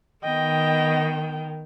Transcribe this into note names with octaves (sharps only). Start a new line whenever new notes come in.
D#3 B3 D#5 G5